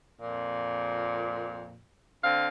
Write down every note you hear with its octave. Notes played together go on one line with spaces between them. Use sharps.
F2 A#2
D3 C4 F5